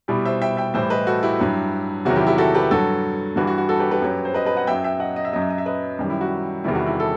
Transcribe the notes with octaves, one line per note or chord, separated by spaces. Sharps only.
B2 G3 E4 G4
C5 E5
E5 G5
E5 G5
A2 E3 G3 C5 E5
B4 D#5
F#4 A4
E4 G4
G2 F#3
E2 C3 D#3 F#3 F#4
E4 G4
E4 G4
F#4 A4
G4 B4
G2 F#3 F#4 A4
G2 E3 G3 F#4
F#4
F#4
F#4 A4
G4 B4
G4 B4
F#2 F#3
C5
B4 D#5
B4 D#5
D#5 F#5
F#2 F#3 E5 G5
E5 G5
D#5 F#5
D#5
E5
F#2 F#3 D#5
E5
D#5
E5
B4 D#5
F#2 D#3 G3
E4
F#4
E2 C3 D#3 G3 E4
F#4
E4
A4